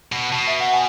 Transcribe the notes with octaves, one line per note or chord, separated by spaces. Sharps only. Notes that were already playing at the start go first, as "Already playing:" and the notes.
B2
B2 A5
E5
F#5
G#5